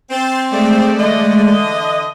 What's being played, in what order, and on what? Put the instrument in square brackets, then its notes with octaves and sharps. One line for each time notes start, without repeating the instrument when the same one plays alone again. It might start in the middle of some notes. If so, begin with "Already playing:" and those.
[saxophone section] C4 [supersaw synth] C6 G6 A6
[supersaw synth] G#3 A3 D5
[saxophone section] D3 E3 D#5